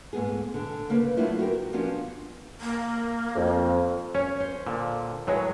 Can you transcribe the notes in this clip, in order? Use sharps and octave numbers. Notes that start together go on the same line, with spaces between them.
G#2 A3 B3 G#4
D3
C#3 A#3 B4
F#3 A3 D4 E4 F4
F#4 G4 A#4
F3 B3 C#4 D4
A#3
F2
C#4 C#5
C5
A#2 D3
A2 F#3 G#3 B4 C#5